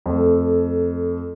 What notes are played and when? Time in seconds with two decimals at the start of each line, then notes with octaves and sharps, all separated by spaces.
0.06 F2 A3